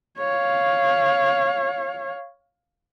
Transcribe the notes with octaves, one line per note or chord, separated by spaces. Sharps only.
C#5 F5